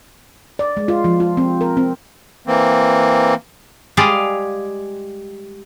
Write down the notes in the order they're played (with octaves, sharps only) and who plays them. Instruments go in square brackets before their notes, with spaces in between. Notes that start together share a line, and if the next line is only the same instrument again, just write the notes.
[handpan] D5
G#3
F4
F3
F4
C4
A#4
C4
[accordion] E3 A#3 C4
[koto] G3 G#3 G#4 D5 F5